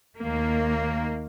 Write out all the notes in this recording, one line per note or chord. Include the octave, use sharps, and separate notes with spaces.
D#2 D#3 A#3